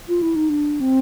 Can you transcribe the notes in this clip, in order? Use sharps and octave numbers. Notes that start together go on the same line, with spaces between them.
F4
E4
D#4
D4
C4